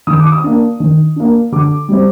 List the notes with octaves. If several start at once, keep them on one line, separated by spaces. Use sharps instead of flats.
D#3 D#6
D6
D#6
A#3 D4
D#3
A#3 D4
D3 D6
G3 C4